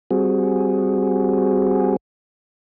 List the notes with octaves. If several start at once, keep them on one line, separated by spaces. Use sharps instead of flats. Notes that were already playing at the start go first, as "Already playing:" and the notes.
G3 C4 F#4 G#4